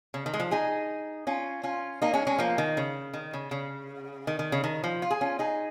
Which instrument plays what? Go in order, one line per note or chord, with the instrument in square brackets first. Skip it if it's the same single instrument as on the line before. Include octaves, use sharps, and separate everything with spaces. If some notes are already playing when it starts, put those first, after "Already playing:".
[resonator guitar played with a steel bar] C#3
D#3
G#3
F3
D#4 G#4
C#4 F4
C#4 F4
A#3 D#4
G#3 C#4
G#3 C#4
F3 A#3
D#3
C#3
D#3
C#3
C#3
D#3
D#3
C#3
D#3
F3
F4
G#4
C#4 F4
D#4 G#4